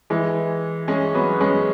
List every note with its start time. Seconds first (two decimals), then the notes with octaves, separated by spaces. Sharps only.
0.10 E3 G#3
0.88 G#3 C#4
1.14 F#3 B3
1.41 G#3 C#4